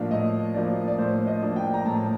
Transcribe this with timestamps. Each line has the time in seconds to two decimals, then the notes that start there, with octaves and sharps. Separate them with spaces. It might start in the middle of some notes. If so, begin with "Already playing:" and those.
Already playing: A2 F3 A#3 D4 F5
0.11 A2 D#5
0.54 F3 A#3 D4 D5
0.88 D5
0.98 A2 C5
1.27 D#5
1.42 F3 A#3 D4
1.56 G5
1.74 A#5
1.85 A2 A5